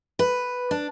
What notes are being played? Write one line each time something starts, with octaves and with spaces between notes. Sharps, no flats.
B4
D4